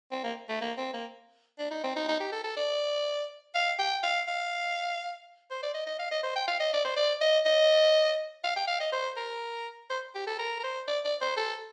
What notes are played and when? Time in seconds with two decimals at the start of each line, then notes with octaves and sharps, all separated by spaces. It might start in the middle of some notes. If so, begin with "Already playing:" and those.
0.12 C4
0.24 A#3
0.49 A3
0.61 A#3
0.78 C4
0.94 A#3
1.59 D4
1.71 D#4
1.84 C4
1.96 D#4
2.08 D#4
2.20 G4
2.32 A4
2.44 A4
2.57 D5
3.55 F5
3.79 G5
4.03 F5
4.28 F5
5.51 C5
5.63 D5
5.74 D#5
5.86 D#5
5.99 F5
6.11 D#5
6.24 C5
6.36 G5
6.48 F5
6.60 D#5
6.73 D5
6.85 C5
6.97 D5
7.21 D#5
7.46 D#5
8.44 F5
8.57 G5
8.68 F5
8.80 D#5
8.93 C5
9.17 A#4
9.90 C5
10.15 G4
10.27 A4
10.39 A#4
10.60 A#4
10.64 C5
10.88 D5
11.05 D5
11.21 C5
11.37 A4